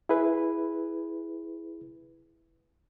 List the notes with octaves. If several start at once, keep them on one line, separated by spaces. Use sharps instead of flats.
E4 G#4 B4